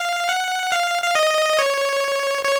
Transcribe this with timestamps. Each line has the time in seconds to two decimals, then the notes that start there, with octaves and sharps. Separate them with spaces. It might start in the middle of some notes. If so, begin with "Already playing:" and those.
Already playing: F5
0.29 F#5
0.72 F5
1.03 F5
1.15 D#5
1.59 C#5
2.44 C#5